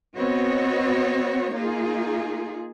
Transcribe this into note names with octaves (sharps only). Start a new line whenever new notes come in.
B3 C4 F#4 C#5 D#5
A#3 D#4 F4 G#4